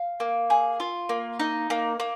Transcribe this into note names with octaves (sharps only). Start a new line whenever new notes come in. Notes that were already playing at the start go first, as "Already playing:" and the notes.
Already playing: F5
A#3
G#4
F4
A#3
D#4
A#3
A#3